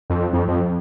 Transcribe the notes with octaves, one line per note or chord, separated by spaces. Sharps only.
F2
F2
F2